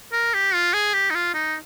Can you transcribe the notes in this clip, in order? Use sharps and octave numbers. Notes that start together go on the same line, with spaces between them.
A#4
G4
F4
G#4
G4
D#4
F4
D#4